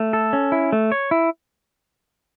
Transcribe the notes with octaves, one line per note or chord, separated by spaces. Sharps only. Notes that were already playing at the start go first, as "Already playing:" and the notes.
Already playing: A3
A4
C#4
E4
A3
C#5
E4